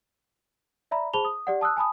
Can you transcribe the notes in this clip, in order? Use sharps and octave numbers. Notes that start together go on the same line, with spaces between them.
D5 E5 A#5 B5
G#4 C5 A5 B5 F7 G7
D#6
G4 D5 F#5
A5 D#6 E6 F#6
G#5 A5 B5 D#6